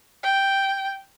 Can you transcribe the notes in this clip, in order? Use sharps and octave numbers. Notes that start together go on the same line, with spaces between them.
G5